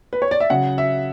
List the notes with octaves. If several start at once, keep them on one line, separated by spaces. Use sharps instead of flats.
B4
C#5
D5
E5
C#3 F#3 F#5
E5